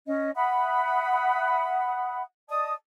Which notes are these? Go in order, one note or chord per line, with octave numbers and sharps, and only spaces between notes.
C#4 D#5
E5 F#5 B5 D#6
D5 D#5 A5 D#6